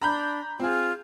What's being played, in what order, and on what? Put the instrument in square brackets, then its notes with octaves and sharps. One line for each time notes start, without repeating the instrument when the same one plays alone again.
[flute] D4 [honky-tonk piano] A#5 B5 G6
[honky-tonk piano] C4 G#4 [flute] F4